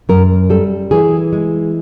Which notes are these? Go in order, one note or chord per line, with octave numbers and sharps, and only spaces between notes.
F#2 A#4
G3 A4
E3 G#4
G#3